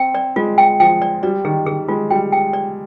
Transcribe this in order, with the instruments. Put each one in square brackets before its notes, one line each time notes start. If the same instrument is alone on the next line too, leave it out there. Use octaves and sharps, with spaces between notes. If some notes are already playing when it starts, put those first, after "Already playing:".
Already playing: [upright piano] C4 [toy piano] G5
[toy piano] D5
[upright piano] G#3 [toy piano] F4
[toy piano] G5
[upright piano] F3 [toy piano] G5
[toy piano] D5
[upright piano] G3 [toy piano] D5
[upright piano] D#3 [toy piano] G#4
[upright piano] D#3 [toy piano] G#4
[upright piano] G#3 [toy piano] F4
[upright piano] G3 [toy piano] G5
[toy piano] G5
D5